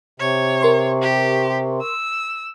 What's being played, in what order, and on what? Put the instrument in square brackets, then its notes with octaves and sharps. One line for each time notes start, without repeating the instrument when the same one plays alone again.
[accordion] C3 [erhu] C#5
[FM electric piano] A#4 C6 C#6
[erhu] G4
E6